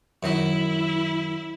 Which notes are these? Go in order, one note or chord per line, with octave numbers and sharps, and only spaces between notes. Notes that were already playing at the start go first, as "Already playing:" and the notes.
F#2 D#3 E4 D#5